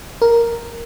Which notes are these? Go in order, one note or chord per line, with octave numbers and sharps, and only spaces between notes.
A#4